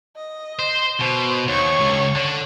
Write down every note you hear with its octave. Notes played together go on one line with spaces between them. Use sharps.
D#5
C5
B2 C5
D#2 C#5 C#6
C#2
D3